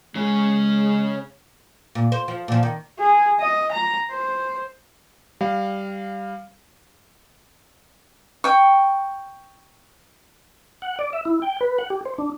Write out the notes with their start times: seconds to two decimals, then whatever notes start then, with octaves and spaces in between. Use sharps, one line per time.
0.15 C#3 G#3 G#4
1.95 A#2
2.12 C5
2.28 F3
2.48 A#2 F3
2.63 D#3
2.99 G#4
3.40 D#5
3.71 A#5
4.11 C5
5.41 G3 F5
8.44 G5 C#6
10.82 F#5
10.99 D5
11.13 E5
11.25 E4
11.42 G5
11.61 B4
11.78 F#5
11.90 G4
12.05 C5
12.18 D4